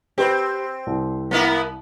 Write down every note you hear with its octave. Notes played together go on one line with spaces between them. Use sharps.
C4 G4 B4 C5
C2
A#3 B3 E4